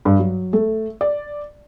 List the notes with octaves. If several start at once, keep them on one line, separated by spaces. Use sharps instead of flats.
G2
F#3
A3
D5